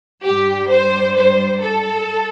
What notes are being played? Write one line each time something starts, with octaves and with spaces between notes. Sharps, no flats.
G2 G3 G4
C5
C5
A4